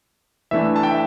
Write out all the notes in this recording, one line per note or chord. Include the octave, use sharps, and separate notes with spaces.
E3 A3 D4 E5
A5
G5
E5